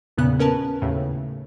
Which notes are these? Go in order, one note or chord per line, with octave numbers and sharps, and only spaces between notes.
E2 A#2 C#3 B3 F#6
C#4 A#4 B4 A5
D#2 A2 C#3